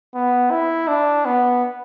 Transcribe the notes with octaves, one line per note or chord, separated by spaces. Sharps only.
B3
E4
D4
B3